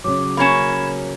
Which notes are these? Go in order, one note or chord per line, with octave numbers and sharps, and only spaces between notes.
C#3 F#3 D6
A#3 C#4 B5 G#6 E7